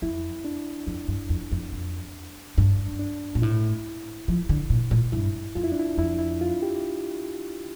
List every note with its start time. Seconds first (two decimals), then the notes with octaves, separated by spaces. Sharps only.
0.02 F2 E4
0.45 D4
0.87 F2
1.08 G2
1.29 F2
1.52 F2
1.72 F2
2.58 G2 D4
2.99 D4
3.35 A#2
3.42 A2 E4
4.28 F3
4.49 D3
4.70 A#2
4.91 A#2
5.12 G2 E4
5.55 F2 F4
5.64 E4
5.72 D4
5.79 E4
5.98 F2 E4
6.19 E4
6.41 F4
6.62 G4